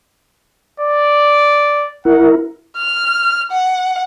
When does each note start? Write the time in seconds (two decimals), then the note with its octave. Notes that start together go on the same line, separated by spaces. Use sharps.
0.80 D5
2.05 E4 A#4 F#5
2.77 F6
3.52 F#5